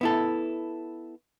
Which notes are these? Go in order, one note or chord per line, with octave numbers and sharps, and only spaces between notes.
B3 E4 A4